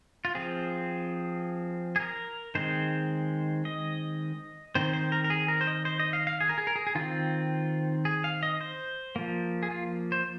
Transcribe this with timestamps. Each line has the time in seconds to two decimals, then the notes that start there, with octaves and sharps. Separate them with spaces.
0.25 F4
0.35 F3 C4 G#4
1.96 G#4
2.00 A#4
2.55 D#3 G#3 C4 C5
3.65 D#5
4.75 D#3 C4 C5
4.93 C5
5.12 A#4
5.24 A#4
5.30 G#4
5.48 A#4
5.61 C5
5.67 D#5
5.85 C5
6.00 D#5
6.13 F5
6.27 F5
6.41 G#4
6.49 A#4
6.58 G#4
6.67 A#4
6.76 G#4
6.87 G#4
6.95 D#3 C4 F4
8.05 G#4
8.24 F5
8.43 D#5
8.61 C5
9.16 F3 A#3
9.63 G#4
9.71 F4
10.12 C5